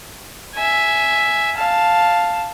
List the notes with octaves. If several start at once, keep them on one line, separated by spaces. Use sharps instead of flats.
E5 G#5
F5 A5